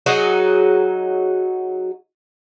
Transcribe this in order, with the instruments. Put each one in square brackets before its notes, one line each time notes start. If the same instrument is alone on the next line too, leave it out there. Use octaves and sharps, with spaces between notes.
[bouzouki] F#3 D#4 F#4 G#4